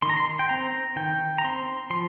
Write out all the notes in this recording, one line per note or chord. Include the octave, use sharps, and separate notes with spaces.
D#3 C6
A#5
C6
G5
C4 A#5
D#3 G5
A#5
C4 C6
F3 C6